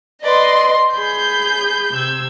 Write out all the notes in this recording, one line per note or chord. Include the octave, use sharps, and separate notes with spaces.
B4 D5 D#5 C6
G#4 B5 G6
C3 E6 G#6